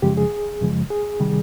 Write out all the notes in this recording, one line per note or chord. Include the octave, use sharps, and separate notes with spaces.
F#2 C#3 F3 G#3 G4
G#4
F#2 C#3 F3 G#3
G#4
C3 D#3 G3